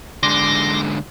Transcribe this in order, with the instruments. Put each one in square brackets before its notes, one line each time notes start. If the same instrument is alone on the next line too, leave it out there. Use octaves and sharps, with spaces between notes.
[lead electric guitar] G#2 D3 [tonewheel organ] C6 D6 A#6